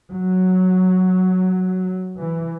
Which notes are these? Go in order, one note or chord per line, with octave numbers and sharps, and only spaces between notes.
F#3
E3